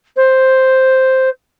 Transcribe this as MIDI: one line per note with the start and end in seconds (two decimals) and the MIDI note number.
0.16 1.29 72